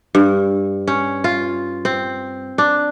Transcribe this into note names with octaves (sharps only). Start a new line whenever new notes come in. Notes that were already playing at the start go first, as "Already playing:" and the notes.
G2
C#4
F4
C4
D4